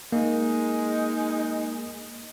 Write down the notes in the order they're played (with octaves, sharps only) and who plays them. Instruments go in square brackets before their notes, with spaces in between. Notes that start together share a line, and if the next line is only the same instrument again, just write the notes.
[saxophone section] G#3 D#4 [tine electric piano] A#3